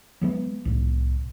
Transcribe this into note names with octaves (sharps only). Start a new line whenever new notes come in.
F#3 G#3 B3
C2 A2